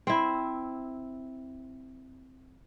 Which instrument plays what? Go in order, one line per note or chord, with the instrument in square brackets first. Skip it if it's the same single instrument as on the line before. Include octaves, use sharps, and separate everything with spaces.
[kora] C4 E4